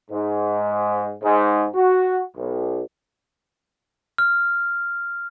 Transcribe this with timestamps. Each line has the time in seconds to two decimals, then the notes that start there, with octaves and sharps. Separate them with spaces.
0.10 G#2
1.22 G#2
1.75 F#4
2.37 B1
4.18 F6